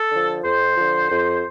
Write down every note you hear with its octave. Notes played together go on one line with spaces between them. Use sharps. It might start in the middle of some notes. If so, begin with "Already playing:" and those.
Already playing: A4
D3 F3
F2 C5
D3 F3
F2